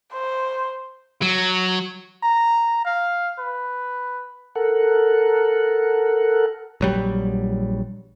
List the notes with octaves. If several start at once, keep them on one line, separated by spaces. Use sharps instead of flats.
C5
F#3
A#5
F5
B4
A4 A#4 F#5
A#1 F#3 G3